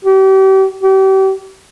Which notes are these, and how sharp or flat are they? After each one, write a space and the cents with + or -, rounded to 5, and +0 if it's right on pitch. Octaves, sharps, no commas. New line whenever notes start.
G4 -35
G4 -35